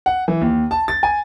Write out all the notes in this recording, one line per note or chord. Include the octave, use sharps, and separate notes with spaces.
F#5
E3
D#2
A5
A6
G#5